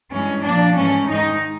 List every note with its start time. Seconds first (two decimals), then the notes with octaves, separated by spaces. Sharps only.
0.12 G2 E3 G#3 C#4
0.44 A#2 F3 A#3 D4
0.76 G#2 E3 A3 C#4
1.09 G#2 D#3 G#3 D#4